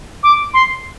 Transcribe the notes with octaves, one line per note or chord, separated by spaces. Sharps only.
D6
C6